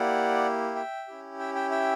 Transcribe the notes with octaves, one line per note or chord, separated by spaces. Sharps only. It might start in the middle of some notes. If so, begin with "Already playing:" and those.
Already playing: A#3 E4 G4 D5 F#5
E5 G5
C#4 E4 G4
E5 G5
E5 G5
E5 G5